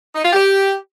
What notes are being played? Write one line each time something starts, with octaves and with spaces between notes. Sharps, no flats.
D#4
F4
G4